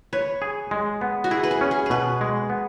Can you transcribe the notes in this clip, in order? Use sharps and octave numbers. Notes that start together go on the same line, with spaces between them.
B4 C#5
G#4
G#3
B3
F#4
E4 G#4
B4
G#4
C#4
G#4
B2 G#4 B4
G#3
B3